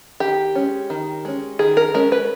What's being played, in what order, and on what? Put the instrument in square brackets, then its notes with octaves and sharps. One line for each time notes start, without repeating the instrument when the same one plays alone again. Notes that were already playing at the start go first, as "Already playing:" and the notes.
[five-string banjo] D#3 G4
G#3 C#4
D#3
G#3 C#4
D#3 G#4
A#4
G#3 C#4 A#4
B4